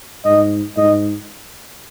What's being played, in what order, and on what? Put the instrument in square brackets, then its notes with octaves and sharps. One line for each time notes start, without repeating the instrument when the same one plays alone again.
[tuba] G#2 [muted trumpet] D#5
[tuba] G#2 [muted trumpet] D#5